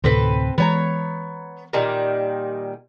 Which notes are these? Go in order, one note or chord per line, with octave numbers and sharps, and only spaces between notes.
D2 A2 C3 C4 A4 B4
E3 G#3 B3 C#5 A#5
A#2 D#3 G3